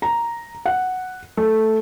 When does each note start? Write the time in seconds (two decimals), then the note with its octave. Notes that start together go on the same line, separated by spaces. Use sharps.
0.02 A#5
0.66 F#5
1.37 A3